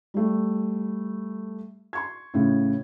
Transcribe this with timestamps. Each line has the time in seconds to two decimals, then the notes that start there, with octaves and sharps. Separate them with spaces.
0.14 G3 A3
1.93 C6 C#6 G#6
2.34 A2 C#3